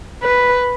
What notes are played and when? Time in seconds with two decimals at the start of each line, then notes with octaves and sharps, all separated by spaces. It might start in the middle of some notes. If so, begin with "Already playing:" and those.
0.23 B4